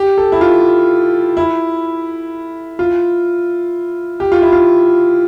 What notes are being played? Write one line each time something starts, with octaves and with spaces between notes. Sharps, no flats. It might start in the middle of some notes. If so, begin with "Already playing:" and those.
Already playing: G4
A4
E4
F4
E4
F4
G4
F4
E4
F4